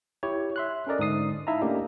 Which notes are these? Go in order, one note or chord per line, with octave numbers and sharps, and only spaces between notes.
E4 G4 C#5
E5 C6 F#6
C#4 A4 A#4 D5 D#5
G#2 D3 D#6 C7
D#4 E4 E5 F5 A5 A#5
A3 A#3 C#4 D4 G4 D#5